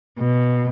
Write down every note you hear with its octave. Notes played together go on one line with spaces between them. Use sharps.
B2